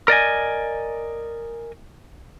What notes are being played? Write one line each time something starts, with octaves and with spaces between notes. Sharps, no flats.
A#4 D5 D#5 G#5